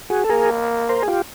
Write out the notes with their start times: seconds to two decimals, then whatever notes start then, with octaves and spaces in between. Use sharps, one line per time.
0.10 F#4 G#4
0.24 A4
0.29 A#3 G#4 A#4
0.89 A#4 C5
1.03 G#4
1.08 F4 G4